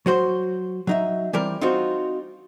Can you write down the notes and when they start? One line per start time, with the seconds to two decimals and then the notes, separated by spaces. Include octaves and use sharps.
0.06 F#3 F#4 C5
0.87 F#3 D#4 E5
1.33 E3 G3 C4 A#4
1.61 C4 D#4 F4 F#4 C5